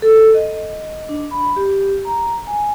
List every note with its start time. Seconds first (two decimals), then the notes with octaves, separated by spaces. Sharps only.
0.02 A4
0.34 D#5
1.09 D4
1.31 B5
1.56 G4
2.05 A#5
2.47 G#5